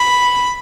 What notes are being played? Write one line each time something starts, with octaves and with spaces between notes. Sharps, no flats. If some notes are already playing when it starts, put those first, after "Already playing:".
Already playing: B5